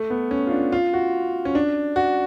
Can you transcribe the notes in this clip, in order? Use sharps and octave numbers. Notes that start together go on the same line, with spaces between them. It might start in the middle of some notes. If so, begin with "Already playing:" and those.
Already playing: A3
B3
C#4
F4
D4
F4
F#4
C#4
D4
F#4